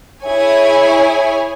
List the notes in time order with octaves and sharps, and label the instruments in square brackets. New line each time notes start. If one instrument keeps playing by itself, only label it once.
[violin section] E4 G#4 C#5 G#5